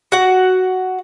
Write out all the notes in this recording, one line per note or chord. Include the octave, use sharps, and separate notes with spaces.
F#4 F#5